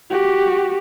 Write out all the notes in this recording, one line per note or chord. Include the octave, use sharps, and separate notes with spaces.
F#4 G4